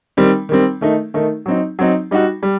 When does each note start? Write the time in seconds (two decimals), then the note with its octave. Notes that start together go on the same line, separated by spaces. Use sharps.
0.17 D#3 G3 C4
0.49 D#3 G3 C4
0.81 D#3 A3 D#4
1.14 D#3 A3 D#4
1.46 F#3 C4 D#4
1.79 F#3 C4 D#4
2.11 G3 D#4 F#4
2.43 G3